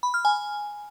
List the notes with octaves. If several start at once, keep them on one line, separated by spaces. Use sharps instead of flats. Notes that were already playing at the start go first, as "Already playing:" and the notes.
B5
F6
G#5